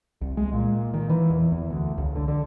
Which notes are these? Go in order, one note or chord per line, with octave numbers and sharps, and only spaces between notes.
C2
G#3
A#2
D#3
E3
E2
E2
D2
C#2
D3
D3